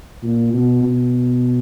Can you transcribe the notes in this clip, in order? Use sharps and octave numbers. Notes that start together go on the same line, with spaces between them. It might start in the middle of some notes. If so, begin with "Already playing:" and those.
A#2
B2
B2